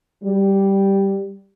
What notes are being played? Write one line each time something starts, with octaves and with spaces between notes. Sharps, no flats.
G3